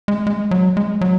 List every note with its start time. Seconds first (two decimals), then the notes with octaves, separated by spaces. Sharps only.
0.08 G#3
0.27 G#3
0.51 F#3
0.77 G#3
1.01 F#3